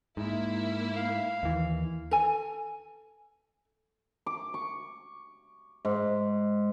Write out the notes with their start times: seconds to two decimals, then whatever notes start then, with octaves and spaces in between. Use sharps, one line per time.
0.17 G#2 A#3 E4
0.97 F5
1.43 D#2 E3
2.11 A4 G#5
4.26 D6
4.54 C#6
5.85 G#2